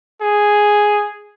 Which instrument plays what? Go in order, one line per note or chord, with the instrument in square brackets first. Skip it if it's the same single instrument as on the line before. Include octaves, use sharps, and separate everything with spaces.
[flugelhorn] G#4